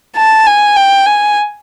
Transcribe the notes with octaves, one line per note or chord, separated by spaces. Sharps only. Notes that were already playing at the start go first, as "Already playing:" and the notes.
A5
G#5
G5
G#5